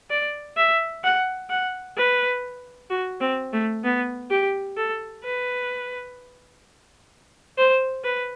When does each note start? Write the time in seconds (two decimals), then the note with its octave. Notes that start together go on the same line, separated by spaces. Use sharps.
0.10 D5
0.57 E5
1.04 F#5
1.50 F#5
1.97 B4
2.90 F#4
3.21 C4
3.53 A3
3.83 B3
4.30 G4
4.77 A4
5.24 B4
7.58 C5
8.04 B4